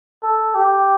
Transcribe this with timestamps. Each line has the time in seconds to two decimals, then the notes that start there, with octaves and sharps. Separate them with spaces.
0.23 A4
0.54 G4